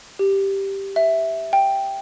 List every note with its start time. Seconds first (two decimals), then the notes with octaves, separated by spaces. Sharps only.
0.19 G4
0.96 E5
1.53 G5